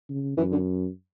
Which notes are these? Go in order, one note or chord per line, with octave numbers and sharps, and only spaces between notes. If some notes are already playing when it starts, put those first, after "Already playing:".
C#3
F#2 E3
D3